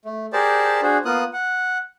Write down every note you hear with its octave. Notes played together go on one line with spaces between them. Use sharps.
A3
G4 G#4 A#4 C5 D5 A5
D4 F#4 G#4 C5
A#3 B3 F4 D#6 F#6
F#5